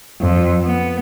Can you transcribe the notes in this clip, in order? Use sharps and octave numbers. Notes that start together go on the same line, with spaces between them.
F2
B3